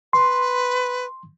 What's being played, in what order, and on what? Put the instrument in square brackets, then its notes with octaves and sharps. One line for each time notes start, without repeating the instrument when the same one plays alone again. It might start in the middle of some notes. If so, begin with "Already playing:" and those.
[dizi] B4 [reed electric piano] C6